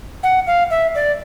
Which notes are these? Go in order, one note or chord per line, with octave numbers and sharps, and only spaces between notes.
F#5
F5
E5
D5